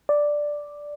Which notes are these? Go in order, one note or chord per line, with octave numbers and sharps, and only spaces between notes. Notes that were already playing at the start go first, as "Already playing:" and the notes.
D5